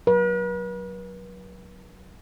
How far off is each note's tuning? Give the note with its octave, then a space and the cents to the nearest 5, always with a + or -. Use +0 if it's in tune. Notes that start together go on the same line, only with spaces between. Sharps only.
F#3 +0 B4 -45